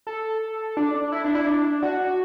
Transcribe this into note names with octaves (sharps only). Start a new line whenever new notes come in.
A4
D4
D4
E4
D4
E4
D4
F#4